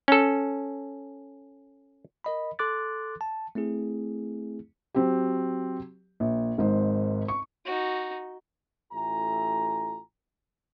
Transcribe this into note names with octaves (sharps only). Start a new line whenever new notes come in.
C#4 A4
A#4 D#5 B5
A4 C6 D6 F#6 A6
A5
A3 C4 E4 G#4
F#3 C4 G4
A#1
G#1 G#2 C5
C#6
D#4 F#4
A1 A3 E4 F4 G#5 A#5